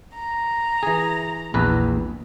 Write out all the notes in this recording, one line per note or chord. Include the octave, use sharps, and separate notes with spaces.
A#5
E3 G#4
A#1 E2 B4